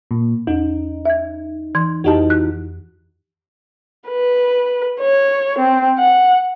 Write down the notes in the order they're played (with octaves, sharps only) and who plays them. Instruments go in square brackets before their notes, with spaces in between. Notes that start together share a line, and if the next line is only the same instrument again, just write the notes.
[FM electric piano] A#2
[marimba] E2 [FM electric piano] D#4
[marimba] E5 G#6
E3 C6 G#6
[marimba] F2 G4 A5 [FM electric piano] E3 D#4 F#4
[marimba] F#6
[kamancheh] B4
C#5
C4
F#5